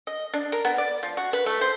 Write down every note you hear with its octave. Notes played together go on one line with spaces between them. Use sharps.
D#5
D4
A#4
B3
D5
F3
F#4
B4
A3
C5